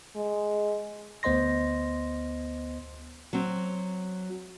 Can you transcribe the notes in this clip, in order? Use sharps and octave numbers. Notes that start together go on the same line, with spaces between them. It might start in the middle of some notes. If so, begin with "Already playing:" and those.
G#3
D2 B3 C5 D#5 C6 A#6
F#3 C4